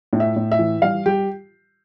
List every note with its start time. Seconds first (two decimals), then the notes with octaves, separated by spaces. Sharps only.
0.13 A2
0.20 E5
0.36 A2
0.52 E5
0.59 E3
0.82 G3 F5
1.06 G3 G4